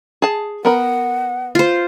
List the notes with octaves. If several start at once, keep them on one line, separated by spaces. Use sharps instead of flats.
G#4 A5
B3 A#4 F#5 B5
F4 C5